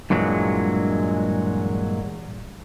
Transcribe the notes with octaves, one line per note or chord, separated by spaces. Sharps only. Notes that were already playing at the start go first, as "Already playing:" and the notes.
G2 A#2 E3 F#3 G#3